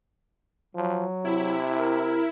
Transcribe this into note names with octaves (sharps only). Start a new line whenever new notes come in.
F3 F#3
C3 E4
A#4